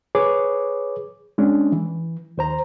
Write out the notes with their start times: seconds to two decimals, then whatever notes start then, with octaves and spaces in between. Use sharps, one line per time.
0.15 G#4 B4 C#5 D6
1.38 G#3 C#4 D4
1.72 E3
2.38 D#2 C5 A#5